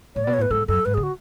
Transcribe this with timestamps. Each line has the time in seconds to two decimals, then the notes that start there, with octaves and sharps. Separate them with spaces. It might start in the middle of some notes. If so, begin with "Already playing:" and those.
0.16 A2 C#5
0.24 B2 D5
0.33 C#5
0.38 A2 B4
0.50 G#2 A4
0.68 F#2 A4
0.85 G#2 B4
0.94 D3 G#4
1.03 F#4